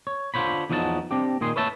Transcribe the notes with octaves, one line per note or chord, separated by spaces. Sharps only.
C#5
D3 F4 C5 C#5 B5
E2 F3 F#3 D#4 F5 A5
C4 D4 G4
A#2 D#3 G#4 C6
B4 C#5 E5 A5